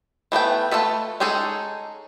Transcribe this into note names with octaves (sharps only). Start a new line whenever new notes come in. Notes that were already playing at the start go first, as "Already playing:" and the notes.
E3 A3 B3 G5
A3 C4 F4 A4 B4
G#3 C#4 D#4 G#4 A4